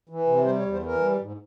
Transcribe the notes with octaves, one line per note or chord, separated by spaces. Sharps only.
E3
C3
G3 C5
C#5
E2
C5
E3 A#4
G3
G#2